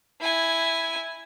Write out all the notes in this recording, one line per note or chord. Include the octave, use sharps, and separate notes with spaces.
E4 G#5